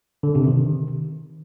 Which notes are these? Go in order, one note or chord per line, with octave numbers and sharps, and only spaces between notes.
D3
C3
D#3